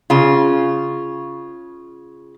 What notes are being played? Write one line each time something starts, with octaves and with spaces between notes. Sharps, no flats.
C#3 F4